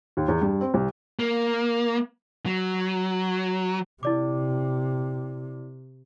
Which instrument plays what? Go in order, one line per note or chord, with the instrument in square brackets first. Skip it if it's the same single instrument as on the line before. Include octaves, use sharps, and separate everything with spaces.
[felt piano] D#2
E2
G2
C4
C2
[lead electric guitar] A#3
F#3
[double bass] C3 [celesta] E4 D5 D6